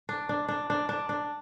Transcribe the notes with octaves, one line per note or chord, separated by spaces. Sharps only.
D4
D4
D4
D4
D4
D4